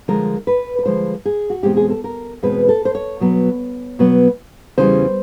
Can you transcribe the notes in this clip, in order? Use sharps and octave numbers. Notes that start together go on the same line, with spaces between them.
D3 F3 G#3 A#4
B4
B4
D3 F3 G#3 C5
G#4
F#4
E2 B2 G#3 C4 G4
G#4
A4
A#4
E2 B2 G#3 C4 B4
A4
C5
C#5
B2 F#3 B3
B2 F#3 B3
E2 C#3 E3 G3 C5